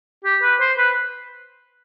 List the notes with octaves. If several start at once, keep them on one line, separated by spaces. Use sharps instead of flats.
G4
B4
C5
B4